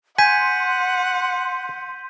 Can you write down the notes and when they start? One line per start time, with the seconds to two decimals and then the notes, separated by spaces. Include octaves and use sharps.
0.18 F#5 G#5 C6 G6 B6 D#7